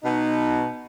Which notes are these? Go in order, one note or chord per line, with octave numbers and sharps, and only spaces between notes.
B2 D#4